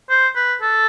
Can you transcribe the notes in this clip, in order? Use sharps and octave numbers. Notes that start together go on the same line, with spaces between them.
C5
B4
A4